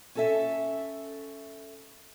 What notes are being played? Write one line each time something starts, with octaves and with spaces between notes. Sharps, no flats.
C#4 A4 E5